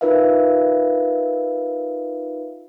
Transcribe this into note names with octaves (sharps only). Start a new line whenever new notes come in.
D#4 F4 A#4 B4 E5 F5